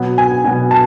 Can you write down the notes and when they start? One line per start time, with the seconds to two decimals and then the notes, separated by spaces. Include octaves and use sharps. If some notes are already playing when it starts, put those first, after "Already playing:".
Already playing: B2 F#3 B3
0.18 G#5
0.44 B2 F#3 B3 G#5
0.71 A5